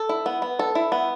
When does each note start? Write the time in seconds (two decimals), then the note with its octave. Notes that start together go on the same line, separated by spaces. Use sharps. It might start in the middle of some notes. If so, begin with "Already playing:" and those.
Already playing: A4
0.09 E4
0.26 B3
0.42 B3
0.59 A4
0.75 E4
0.92 B3